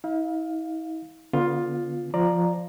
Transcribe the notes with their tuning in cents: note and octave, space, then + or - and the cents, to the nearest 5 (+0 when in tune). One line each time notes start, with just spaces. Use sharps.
E4 -45 F5 +15
D3 -35 B3 -25 F4 +10
F3 +0 D5 +15 A#5 +0